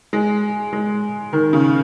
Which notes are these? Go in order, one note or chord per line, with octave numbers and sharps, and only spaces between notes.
G#3
G#3
D#3
C#3